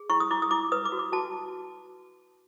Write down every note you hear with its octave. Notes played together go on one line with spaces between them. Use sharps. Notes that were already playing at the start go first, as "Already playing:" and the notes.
Already playing: G#4
E4 C#6
D#6
E4 D6
D#6
E4 D6
B4 D#6
D6
F#4
D6
F#4 A5